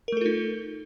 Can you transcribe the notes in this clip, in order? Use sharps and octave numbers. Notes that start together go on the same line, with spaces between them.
A3 D#4 F4 A4 A#4